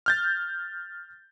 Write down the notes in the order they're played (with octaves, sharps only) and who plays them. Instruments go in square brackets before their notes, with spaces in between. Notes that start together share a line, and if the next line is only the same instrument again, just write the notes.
[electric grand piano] F6 G6 A6